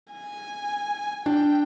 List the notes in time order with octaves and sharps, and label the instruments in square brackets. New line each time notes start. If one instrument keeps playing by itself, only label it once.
[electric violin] G#5
[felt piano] D4 [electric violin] G5